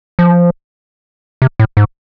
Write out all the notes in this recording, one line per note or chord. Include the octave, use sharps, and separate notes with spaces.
F3
C3
A2
G#2